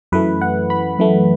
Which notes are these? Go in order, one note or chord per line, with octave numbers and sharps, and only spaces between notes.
F#2 E3 A3 B4
F#5
B5
F#2 E3 A3